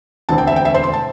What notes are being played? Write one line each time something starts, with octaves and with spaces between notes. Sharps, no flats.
E1 D2 D3 C4 A5
G5
E5
G5
E5
C5
C6
A5